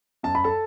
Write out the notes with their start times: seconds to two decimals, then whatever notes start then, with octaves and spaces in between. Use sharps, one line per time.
0.23 F#2 A5
0.35 B5
0.44 A4 A5